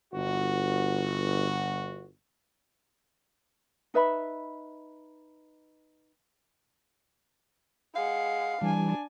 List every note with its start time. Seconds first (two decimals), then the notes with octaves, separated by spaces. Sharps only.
0.14 G1 F#4
3.94 D#4 B4 E5 B5
7.96 G#3 F5 F#5
8.61 E3 G3 D4 G#5